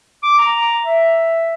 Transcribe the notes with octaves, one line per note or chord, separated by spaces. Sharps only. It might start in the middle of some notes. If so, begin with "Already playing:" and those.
D6
A#5
E5